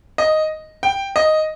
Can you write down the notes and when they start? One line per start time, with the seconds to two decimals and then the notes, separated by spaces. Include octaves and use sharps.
0.18 D#5
0.83 G5
1.16 D#5